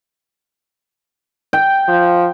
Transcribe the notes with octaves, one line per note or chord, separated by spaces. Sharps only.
G5
F3